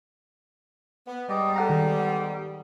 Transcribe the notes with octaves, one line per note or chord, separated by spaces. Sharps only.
B3
G#2 G3 D5 D#5
B3 A4 F#5 A#5
D#3